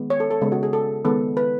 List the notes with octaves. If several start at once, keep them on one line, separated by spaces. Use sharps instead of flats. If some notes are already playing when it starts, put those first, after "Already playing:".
Already playing: D#3 G#3 B3
C#5
A4
A4
C#3 G#3 B3
F#4
G#4
A4
D#3 G#3 B3 A4
B4